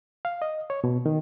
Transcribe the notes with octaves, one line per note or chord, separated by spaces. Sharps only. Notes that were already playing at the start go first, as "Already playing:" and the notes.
F5
D#5
C#5
B2
D#3